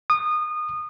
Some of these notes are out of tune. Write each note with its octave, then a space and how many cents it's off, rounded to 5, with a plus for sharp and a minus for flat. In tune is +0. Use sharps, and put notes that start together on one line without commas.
D#6 -25